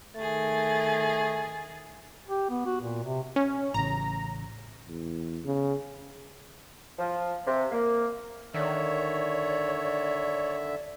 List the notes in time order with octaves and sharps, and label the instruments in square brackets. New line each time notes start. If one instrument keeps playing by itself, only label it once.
[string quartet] D#3 G#4 A6 [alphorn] A3
[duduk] G4
B3
F#4
A#2
C3
[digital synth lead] C#4
[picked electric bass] A1 C#3 [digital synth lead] A#5
[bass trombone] E2
C#3
[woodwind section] F3
C3
A#3
[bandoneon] D3 E5 [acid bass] D#3 [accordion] C#5 [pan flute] D5